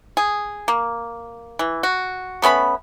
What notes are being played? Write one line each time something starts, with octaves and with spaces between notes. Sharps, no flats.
G#4
A#3
E3
F#4
A3 B3 C#4 B5